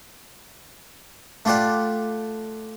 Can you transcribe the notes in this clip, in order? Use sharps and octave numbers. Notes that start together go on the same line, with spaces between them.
A3 F4 G4 D5 F#5